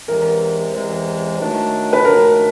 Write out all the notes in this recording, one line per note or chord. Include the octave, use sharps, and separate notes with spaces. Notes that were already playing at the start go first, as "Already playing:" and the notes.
E2 C3 E3 G#3 A#4
E2 C3 E3 G#3
D#3 F#3 A3 D4
B4
D#3 F#3 A3 D4 A#4